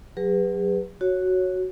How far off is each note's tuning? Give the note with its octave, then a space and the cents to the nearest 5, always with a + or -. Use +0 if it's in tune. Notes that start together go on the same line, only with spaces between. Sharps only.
F#3 +0 G#4 -45 B4 +0
F#4 +0 C#5 -5